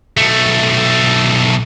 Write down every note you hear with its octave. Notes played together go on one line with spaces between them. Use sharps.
B1 A3